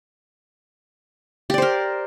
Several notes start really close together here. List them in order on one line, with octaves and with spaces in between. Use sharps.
G4 D5 C5 A#4